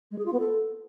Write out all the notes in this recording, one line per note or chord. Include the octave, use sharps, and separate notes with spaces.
G#3
G#4
F4
B3
A4